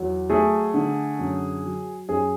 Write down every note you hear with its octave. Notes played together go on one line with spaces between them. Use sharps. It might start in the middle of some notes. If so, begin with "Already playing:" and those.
Already playing: E2 F#3
A3 G#4
D3
F#2
F#3
F#2 G#4